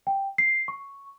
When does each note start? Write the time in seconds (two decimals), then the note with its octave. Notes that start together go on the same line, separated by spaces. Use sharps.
0.07 G5
0.38 C7
0.68 C#6